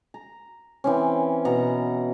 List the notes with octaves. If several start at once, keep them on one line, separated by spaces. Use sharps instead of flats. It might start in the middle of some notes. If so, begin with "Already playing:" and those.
A#5
E3 C4 C#4
B2 F#5 A#5